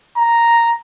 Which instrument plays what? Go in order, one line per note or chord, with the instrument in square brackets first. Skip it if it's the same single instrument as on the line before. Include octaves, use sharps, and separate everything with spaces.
[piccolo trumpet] A#5